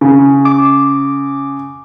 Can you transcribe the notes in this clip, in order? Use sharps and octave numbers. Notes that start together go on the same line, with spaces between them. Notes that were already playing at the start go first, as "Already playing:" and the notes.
C#3
D6